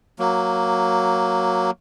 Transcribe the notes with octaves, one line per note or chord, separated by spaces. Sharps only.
F#3 A#3